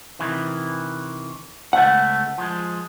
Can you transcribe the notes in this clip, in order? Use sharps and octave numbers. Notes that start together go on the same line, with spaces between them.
C3 D#3 E3
C#2 A3 B3 F#5
F3 G#3